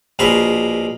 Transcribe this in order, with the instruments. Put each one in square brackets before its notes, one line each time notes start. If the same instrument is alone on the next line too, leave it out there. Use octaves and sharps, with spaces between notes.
[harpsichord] A#1 B2 G#4 A#4 B5 C6